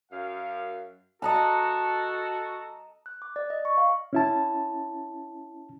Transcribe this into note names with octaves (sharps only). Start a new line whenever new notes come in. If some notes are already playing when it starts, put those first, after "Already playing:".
F#2 F5
F#4 A4 D#5 A5 A#5
F#6
D6
D5
D#5
C#6
F5
C#4 E4 A5